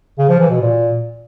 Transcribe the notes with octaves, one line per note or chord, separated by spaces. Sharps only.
C#3
F3
E3
B2
A#2